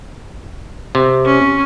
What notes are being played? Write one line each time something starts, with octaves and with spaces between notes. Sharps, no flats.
C3
C#4